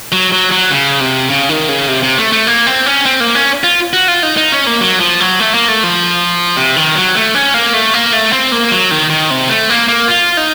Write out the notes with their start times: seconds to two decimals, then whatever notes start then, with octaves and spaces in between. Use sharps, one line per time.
0.12 F#3
0.32 F#3
0.52 F#3
0.71 C#3
1.00 C3
1.30 C#3
1.49 D#3
1.69 C#3
1.88 C3
2.03 C3
2.18 A3
2.32 A3
2.47 A#3
2.67 C4
2.86 C#4
3.06 C4
3.20 A#3
3.35 C#4
3.64 F4
3.93 F#4
4.08 F4
4.23 D#4
4.37 D#4
4.52 C#4
4.67 A#3
4.81 F#3
5.00 F3
5.20 F#3
5.40 A3
5.54 A#3
5.69 A3
5.83 F3
6.57 C3
6.76 D#3
6.95 F#3
7.15 A3
7.35 C#4
7.54 A#3
7.74 A3
7.94 A#3
8.13 A3
8.32 C4
8.52 A#3
8.71 F#3
8.91 D#3
9.10 D#3
9.30 C3
9.49 A3
9.70 A#3
9.88 A#3
10.08 F4
10.37 D#4